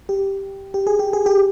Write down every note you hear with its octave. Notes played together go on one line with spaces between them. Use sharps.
G4
G4
G#4
G4
G#4
G4